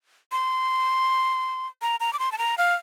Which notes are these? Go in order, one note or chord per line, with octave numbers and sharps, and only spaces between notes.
C6
A#5
A#5
D6
C6
A5
A#5
F5